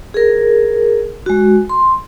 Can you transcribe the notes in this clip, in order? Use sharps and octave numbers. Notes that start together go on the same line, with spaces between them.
G#4 A#4
G#3 F#4
C6